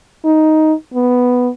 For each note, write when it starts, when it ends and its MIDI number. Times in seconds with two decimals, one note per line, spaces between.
0.24 0.73 63
0.94 1.49 59